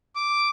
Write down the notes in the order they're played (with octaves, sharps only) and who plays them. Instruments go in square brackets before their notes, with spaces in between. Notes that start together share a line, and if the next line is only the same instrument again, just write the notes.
[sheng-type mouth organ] D6